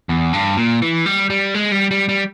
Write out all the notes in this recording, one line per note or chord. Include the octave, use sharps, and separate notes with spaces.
E2
G2
A#2
E3
G3
G3
G#3
G3
G3
G3